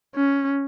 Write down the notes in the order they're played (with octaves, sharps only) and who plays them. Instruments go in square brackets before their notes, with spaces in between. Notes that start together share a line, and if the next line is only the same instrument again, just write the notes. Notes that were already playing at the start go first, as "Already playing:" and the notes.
[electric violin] C#4